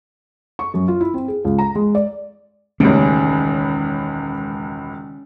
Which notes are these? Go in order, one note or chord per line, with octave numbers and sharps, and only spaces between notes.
C#6
F#2
F4
E4
C4
G#4
C#2
A#5
G#3
D5
E1 C#2 A2 D#3 C#4 G4